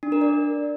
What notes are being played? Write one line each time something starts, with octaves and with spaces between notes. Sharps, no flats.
D4
A#4
D5